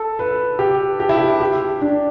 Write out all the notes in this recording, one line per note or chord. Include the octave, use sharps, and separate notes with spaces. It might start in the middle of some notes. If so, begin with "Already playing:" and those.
Already playing: A4
B4
G4
G4
E4
G4
G4
D4